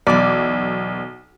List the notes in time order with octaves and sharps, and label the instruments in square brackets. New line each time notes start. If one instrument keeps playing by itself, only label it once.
[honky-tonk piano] B1 [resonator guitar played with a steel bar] E2 D5